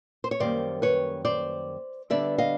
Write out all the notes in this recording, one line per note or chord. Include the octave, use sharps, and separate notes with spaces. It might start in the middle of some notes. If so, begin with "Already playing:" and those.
C5
C#5
F#2 D#3 G3 A#3 C5 D5
B4 C#5
C5 D5
D3 G3 B3 D4 D5 E5
D#5 F5